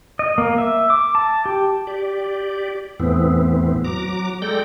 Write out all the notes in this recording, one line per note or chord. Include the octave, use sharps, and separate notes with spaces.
D#5
A#3
E5
D6
A5
G4
G4 D5
E2 A2 E3 B3 C4
F#3 A#5 D6
G#3 A4 D5 G5 G6 A#6